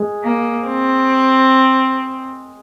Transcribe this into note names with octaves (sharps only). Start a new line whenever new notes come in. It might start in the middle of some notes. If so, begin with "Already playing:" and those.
Already playing: G#3 G#4
A#3
C4